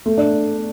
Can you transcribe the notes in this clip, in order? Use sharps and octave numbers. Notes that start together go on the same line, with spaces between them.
A3
D4